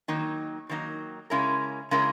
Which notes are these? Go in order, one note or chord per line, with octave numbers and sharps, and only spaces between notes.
D#3 F#3 A#3 D#4
D#3 F#3 A#3 D#4
C#3 G#3 C#4 E4 A#4
C#3 G#3 C#4 E4 A#4